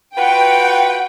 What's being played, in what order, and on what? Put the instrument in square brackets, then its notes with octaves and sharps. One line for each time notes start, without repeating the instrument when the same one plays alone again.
[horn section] F4 F#4 B4 [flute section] F#5 [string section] G5